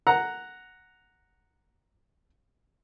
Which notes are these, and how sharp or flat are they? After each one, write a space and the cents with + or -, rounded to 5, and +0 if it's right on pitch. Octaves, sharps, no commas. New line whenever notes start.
F#5 +0 A#5 +0